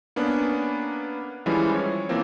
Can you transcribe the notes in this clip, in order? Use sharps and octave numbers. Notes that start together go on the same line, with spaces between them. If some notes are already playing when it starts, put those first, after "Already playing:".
A#3 B3 C#4 D4
E3 F3 G3 G#3 C#4 E4
C#5
E3 F3 A#3 C4